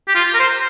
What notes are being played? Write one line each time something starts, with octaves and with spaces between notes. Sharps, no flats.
G4
F4
A#4
C5